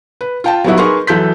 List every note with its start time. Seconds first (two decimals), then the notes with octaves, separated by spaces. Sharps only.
0.21 B4
0.44 F4 G5 A5
0.64 F#3 G3 B3 D#4 E4 F#4
0.78 D#4 G#4 A#4 B4 C6 C#6
1.07 F#2 E3 A4 G6 B6